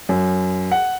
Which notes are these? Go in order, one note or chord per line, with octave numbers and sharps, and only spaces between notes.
F#2
F#5